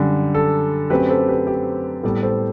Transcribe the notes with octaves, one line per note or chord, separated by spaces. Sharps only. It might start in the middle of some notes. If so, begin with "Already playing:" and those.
Already playing: F#2 D3 G3
A4
F#2 F#3 A3 C4 G4 B4
A4 C5
G4 B4
G4
A2 G3 B3 A4
A4 C5